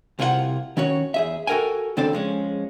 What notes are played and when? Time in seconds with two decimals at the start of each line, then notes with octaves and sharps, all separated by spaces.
0.19 C2 C3 E4 F4 G4 F#5
0.77 D#3 C#4 F#4 C#5
1.14 E2 G#4 E5
1.47 F#4 A4 A#4 G5 G#5
1.97 D#2 C#3 C4 D4 A4 D5
2.13 F3 G#3 C#4